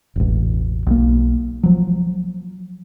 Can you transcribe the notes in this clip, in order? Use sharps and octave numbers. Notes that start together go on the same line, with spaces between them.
E1 A1
B1 A#3
F3 F#3